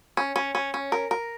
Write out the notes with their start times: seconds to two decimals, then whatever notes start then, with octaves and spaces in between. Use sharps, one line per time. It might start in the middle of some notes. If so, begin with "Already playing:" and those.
0.17 C#4
0.36 C#4
0.55 C#4
0.74 C#4
0.92 A#4
1.11 A#4